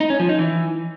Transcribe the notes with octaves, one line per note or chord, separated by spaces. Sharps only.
D#4
C#4
F3
D#4
E3